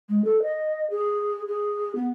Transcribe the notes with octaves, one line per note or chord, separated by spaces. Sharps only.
G#3
A4
D#5
G#4
G#4
B3